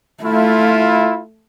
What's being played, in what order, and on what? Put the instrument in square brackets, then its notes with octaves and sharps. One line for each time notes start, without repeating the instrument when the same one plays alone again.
[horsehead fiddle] A3 [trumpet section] E4 F4